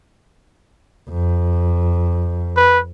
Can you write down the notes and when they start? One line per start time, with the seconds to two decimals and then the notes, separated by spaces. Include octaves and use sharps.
1.10 F2
2.56 B4